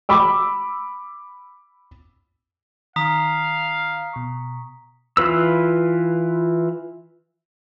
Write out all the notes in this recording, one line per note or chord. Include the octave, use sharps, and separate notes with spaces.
B5 D6 E6
D#3 F5 A#5 D#6 B6
B2 C#6
E3 F4 B4 E6